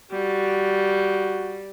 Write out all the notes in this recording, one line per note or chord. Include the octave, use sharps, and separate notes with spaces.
G3 F#4